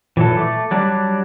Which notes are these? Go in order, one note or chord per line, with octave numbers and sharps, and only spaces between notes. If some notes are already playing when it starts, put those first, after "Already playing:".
A#2 E3 F#3 A4
A3 D6
F#3 G3 D4